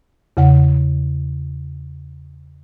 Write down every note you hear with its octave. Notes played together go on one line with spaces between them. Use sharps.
E2 C#3 F#5